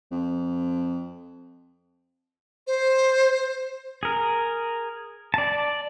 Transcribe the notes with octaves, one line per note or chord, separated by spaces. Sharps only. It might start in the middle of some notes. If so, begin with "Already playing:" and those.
F2
C5
G#4 A#4
D5 A5